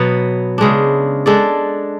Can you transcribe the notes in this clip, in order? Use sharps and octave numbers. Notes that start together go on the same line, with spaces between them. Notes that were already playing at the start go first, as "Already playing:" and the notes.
Already playing: B2 F#3 B3
C#3 G#3 D4
G#3 D4 A4 D5